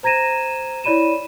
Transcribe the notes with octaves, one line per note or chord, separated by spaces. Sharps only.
C5 A#5 G#6 A#6 D#7 E7
E4 C#5 D5 B5 D#7 E7